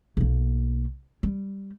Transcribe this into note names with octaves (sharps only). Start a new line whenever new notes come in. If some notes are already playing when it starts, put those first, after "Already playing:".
B1 A#3
G3